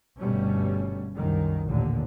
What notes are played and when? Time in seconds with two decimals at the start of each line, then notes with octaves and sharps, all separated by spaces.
0.20 G1 G2 B2 G3 A3 C#4
1.16 C2 F#2 D#3
1.68 A1 D#2 A#2 D3